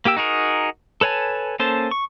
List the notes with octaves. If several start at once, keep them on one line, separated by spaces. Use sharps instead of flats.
A#3 G4 G5 E6
D#4 F#4 G#4 A#4
A4 B4 C#5 G#5 A5
A#3 C#4 A4 C5 A5
C#6